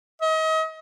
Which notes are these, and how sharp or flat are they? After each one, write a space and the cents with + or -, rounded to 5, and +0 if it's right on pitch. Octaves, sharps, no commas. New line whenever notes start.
D#5 +35